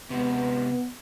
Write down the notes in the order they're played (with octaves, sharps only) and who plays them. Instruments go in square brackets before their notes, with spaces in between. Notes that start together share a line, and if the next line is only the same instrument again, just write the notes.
[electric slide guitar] C3 G#3 [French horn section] B3